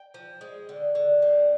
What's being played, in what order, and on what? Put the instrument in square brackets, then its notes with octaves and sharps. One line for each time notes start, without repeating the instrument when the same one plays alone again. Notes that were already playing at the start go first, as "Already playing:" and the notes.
Already playing: [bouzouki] G5
F3
G#3
D3
D3
C4